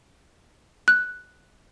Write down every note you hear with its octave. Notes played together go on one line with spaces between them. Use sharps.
F#6